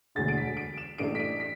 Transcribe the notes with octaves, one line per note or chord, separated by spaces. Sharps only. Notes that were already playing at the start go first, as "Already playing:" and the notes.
E1 D2 D3 A6
D7
B6
D7
E7
A1 A2 A3 D4 D7
B6
D7
B6